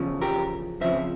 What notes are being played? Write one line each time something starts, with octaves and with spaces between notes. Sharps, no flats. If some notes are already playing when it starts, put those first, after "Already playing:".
Already playing: E2 C#3 F3
G4 A#4
F2 C#3 F3 C5 E5